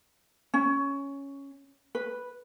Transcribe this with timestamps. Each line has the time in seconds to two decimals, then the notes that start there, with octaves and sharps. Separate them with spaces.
0.54 C#4
1.95 B4